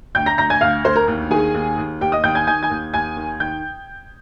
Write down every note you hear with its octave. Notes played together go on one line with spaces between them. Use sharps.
D2 G5 G6
A#5 A#6
D2 A#5 A#6
G#5 G#6
D2 F5 F6
D2 C5 C6
A#4 A#5
D#2
D#3 G#4 G#5
D#2
D#2
D#2 G4 G5
D#5 D#6
D#2 G5 G6
G#5 G#6
D#3 G#5 G#6
G#5 G#6
D#2
D#2 G#5 G#6
D#3
D#3 G5 G6